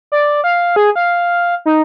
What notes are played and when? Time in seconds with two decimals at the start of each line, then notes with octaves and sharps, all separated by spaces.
0.12 D5
0.44 F5
0.76 G#4
0.96 F5
1.66 D#4